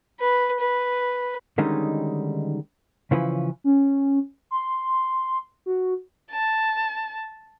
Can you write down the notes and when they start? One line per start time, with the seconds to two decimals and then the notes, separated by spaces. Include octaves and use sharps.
0.20 B4
0.60 B4
1.58 D3 D#3 G3 G#3 C#4 D#4
3.11 C#3 E3 F3 C#4 E4 B4
3.64 C#4
4.51 C6
5.66 F#4
6.32 A5